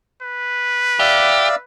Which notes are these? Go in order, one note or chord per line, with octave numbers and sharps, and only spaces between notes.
B4
G4 D5 E5 F5